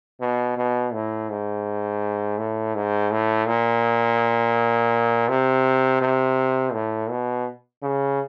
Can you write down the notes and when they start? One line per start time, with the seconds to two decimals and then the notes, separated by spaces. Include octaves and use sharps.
0.21 B2
0.57 B2
0.94 A2
1.30 G#2
2.38 A2
2.75 G#2
3.11 A2
3.47 A#2
5.29 C3
6.01 C3
6.73 A2
7.10 B2
7.82 C#3